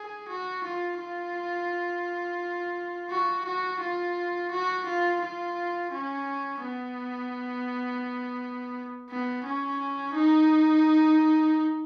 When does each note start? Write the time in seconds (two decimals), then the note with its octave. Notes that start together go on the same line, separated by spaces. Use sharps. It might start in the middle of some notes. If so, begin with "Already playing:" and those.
Already playing: G#4
0.28 F#4
0.64 F4
0.99 F4
3.10 F#4
3.45 F#4
3.81 F4
4.51 F#4
4.86 F4
5.22 F4
5.92 C#4
6.63 B3
9.09 B3
9.44 C#4
10.15 D#4